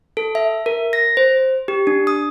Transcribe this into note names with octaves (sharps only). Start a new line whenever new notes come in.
A4
E5
A#4
A#6
C5
G4
D4
D#6